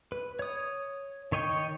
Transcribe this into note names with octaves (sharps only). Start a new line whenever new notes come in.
B4
C#5 D#6
D#3 C#5 D#5 G5 C#6